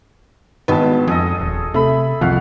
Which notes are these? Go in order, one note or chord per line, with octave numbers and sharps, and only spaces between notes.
G#1 G2 B3 A5
F2 G#4 A4 D#5
D#1
C3 A3 E5 B5
C2 F2 F#4 F5 F#5